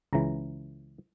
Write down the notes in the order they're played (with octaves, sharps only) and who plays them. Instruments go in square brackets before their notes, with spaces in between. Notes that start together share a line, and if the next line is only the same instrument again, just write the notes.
[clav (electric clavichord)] C#2 C#3 E3 A#5